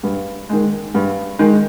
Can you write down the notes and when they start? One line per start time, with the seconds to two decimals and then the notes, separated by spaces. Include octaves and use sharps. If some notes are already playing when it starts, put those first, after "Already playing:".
0.03 G2
0.49 D#3 G#3
0.94 G2
1.39 D#3 G#3